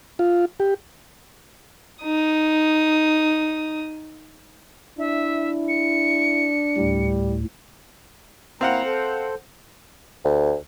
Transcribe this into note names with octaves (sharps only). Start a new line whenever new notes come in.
F4
G4
D#4 D#6
D4 E4 E5
C#7
D2 A2 G3
A#3 C4 E4 F5 F#5 A#5
A4 C5
D2